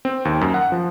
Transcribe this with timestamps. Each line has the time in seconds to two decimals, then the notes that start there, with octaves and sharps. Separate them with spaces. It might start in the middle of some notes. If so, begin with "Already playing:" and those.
0.05 C4
0.25 D#2
0.41 F#2
0.54 F#5
0.72 F3